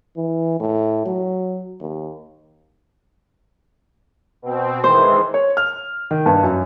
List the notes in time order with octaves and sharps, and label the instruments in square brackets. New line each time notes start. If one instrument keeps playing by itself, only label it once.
[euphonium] E3
A2
F#3
D#2
[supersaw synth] B2 C4
[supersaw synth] D#3 E3 G#3 [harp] C5
[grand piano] C#5
F6
D#3
G2
F#2